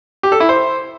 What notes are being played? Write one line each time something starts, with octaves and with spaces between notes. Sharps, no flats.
G4
A4
E4
C5